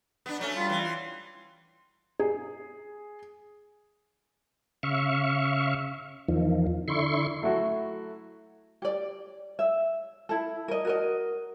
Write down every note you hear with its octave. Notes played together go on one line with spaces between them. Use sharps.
B3 D4
F#3 A3 C#4
G3 F4
E3
C6
G#4
C#3 E5 F5 C#6
E2 D#3 F3
D3 E4 C6 C#6
F#3 A3 E4 F#4
G4 D5
E5
E4 A4
A#4 D#5
F#4 A#4 D#5